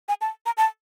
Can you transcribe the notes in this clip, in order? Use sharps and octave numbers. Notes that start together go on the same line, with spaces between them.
G#5
A5
A#5
A5